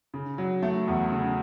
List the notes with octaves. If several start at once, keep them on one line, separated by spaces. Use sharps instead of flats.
C#3
F#3
A3
E2
C#3